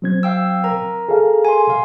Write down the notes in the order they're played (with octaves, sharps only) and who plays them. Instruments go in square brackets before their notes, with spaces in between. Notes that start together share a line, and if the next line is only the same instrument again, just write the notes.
[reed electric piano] F#3 C4 G#6
[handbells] F5 G5 E6
A#4 A#5
[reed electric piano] G#4 A4 F5
[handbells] G#5 C6
F5